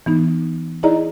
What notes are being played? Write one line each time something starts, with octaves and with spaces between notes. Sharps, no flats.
E3 B3 D#4
D#4 E4 G#4 D5 D#5 A#5